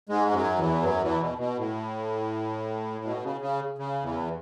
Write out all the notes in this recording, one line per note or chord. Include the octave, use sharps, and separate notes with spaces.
G#2 G#3
G#3
F#2 F#3
E2 E3
F#2 F#3
E2 E3
B2
B2
A2
B2
C#3
C#3
C#3
E2 E3